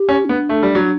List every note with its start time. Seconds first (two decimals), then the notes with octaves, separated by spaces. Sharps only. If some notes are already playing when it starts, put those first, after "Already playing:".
Already playing: G4
0.09 C#4
0.25 C#4
0.29 B3 D4
0.49 A3
0.63 G3
0.75 F#3